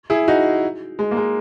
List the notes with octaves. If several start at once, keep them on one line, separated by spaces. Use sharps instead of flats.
E4 G#4
D#4 F#4
G#3
A#3
G#3